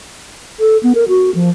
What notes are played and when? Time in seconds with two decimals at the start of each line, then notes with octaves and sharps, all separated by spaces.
0.60 A4
0.83 B3
0.95 A#4
1.08 F#4
1.35 F3